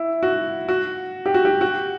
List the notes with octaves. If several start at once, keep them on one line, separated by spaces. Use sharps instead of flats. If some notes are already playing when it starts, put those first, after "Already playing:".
Already playing: E4
F#4
F#4
G4
F#4
G4
F#4